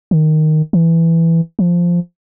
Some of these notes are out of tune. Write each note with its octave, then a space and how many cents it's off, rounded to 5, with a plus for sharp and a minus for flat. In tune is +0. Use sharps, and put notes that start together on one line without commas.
D#3 -5
E3 +5
F3 -5